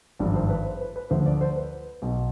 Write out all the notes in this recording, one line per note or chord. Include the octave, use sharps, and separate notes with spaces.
G#1 G2 F3 D5
C5
B4
C5
B4
B4
D2 D3 F3 C5
D5
C5
B4
B1 B2